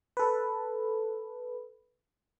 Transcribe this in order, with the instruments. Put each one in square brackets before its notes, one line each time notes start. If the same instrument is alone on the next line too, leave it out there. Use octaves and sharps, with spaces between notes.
[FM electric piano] A4 B4